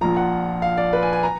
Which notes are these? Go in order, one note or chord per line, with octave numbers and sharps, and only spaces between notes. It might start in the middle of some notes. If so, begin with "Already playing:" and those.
A#1 A#2 F3 A#5
F#5
F5
D5
B4
G#5
G#5
A#5